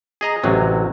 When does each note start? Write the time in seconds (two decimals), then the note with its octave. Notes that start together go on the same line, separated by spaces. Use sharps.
0.21 G#4 D#5 A#5
0.44 A1 C3 F#3